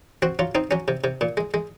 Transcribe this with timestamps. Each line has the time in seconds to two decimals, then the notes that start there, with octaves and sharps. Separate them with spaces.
0.22 C4 F#4
0.39 F#3 F4
0.55 C4 D#4
0.71 F#3 C#4
0.88 C3
1.04 C3
1.21 A#2
1.37 G#3
1.54 G#3